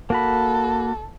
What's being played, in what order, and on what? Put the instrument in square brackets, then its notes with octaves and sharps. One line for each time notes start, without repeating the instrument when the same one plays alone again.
[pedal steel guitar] A#3 F#4 B5 [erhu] A4